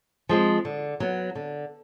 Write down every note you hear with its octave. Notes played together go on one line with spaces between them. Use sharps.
F3 G#3 C4
D3
F#3 B3
D3